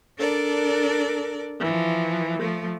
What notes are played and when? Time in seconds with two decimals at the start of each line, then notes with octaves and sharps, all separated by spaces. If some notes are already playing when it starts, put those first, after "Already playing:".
0.18 D4 A4 A#4 D5
1.59 E3 F3
2.39 F3 A3